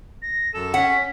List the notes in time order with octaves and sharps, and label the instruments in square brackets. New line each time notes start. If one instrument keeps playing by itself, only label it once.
[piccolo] A#6
[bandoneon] F#2 A4 [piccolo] E7
[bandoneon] C#4 [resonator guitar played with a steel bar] F#5 [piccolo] B6